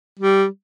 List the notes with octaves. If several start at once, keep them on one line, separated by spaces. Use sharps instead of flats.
G3